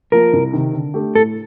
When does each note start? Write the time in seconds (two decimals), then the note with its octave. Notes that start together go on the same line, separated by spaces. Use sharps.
0.12 F3 A#3 A#4
0.33 C2
0.53 C3 D#3
0.74 D3
0.94 A3 D4 G4
1.15 A2 A4